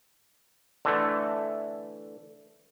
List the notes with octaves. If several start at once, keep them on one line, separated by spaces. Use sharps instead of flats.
D3 E3 A3